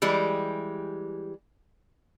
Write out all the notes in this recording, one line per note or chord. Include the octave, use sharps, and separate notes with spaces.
E3 G3 G#3 G4